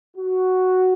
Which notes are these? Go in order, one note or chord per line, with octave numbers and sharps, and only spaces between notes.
F#4